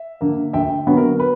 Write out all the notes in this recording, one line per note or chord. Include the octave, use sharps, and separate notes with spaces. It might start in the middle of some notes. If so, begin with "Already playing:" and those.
Already playing: E5
D3 A#3
D2 E5 G5
D3 F#3 B3
A#4
B4